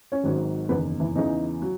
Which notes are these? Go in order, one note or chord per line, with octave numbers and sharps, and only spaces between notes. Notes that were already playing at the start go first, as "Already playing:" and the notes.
C#4 C#5
G#1 G#2 D#3 F#3
F#1 E2 D#3 B3 B4
E3 E4
E2 C#3 E3 D#4
F#3